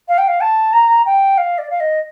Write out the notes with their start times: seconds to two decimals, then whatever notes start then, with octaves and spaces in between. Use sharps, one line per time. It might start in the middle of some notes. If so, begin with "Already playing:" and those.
0.08 F5
0.18 G5
0.28 F5
0.41 A5
0.73 A#5
1.06 G5
1.38 F5
1.58 D5
1.70 F5
1.80 D#5